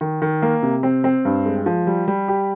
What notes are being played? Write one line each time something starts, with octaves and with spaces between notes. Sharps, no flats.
D#3
D#3
A#3
C3
C4
C4
G2
G#3
F3
G3
G3
G4